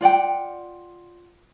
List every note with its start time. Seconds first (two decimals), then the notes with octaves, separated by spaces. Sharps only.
0.01 F4 D5 F#5 G5